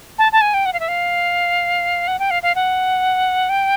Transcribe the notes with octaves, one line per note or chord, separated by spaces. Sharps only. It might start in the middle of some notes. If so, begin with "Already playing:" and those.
A5
A5
G#5
G5
F#5
F5
E5
F5
F#5
G5
F5
F5
F#5
G5